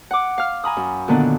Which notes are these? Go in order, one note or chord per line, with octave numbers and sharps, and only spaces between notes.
F#5 D6
F5 F6
G#5 A#5 B5 D#6
F#2
A#2 D3 D#3 B3 D4